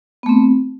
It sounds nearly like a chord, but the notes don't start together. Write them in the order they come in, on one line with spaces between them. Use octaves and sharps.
B3 A3 C4